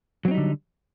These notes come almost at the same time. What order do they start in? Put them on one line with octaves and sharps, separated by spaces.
F#3 C4 D#4 G3 D3